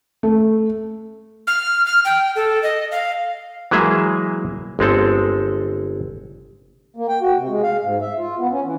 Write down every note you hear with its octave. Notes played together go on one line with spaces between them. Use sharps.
A3
F6
F6
G5
A4
D#5
F5
E3 F#3 G#3 A#3 G#4 E5
G1 G#3 C4 A4
A#3
G5
F#4
C3
G#3
F5
G#2
E5
F4
B3
C#4
E3